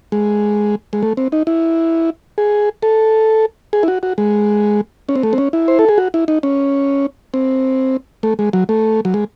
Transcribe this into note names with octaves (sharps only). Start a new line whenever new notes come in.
G#3
G#3
A3
C4
D#4
E4
G#4
A4
G#4
E4
F#4
F#4
G#3
C#4
C4
A3
C4
C#4
E4
C5
A4
G#4
F#4
E4
D#4
C#4
C4
A3
G#3
F#3
A3
F#3
G#3